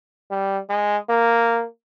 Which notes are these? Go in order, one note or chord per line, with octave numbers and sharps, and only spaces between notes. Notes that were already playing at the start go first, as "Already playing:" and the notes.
G3
G#3
A#3